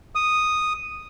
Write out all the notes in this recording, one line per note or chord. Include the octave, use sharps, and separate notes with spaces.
D#6